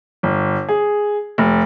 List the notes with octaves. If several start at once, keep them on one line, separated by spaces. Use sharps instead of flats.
G1
G#4
F1